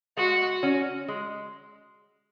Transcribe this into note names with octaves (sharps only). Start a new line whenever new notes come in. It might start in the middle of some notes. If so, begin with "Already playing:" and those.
G#3 F#4
C#4 F#4
G#3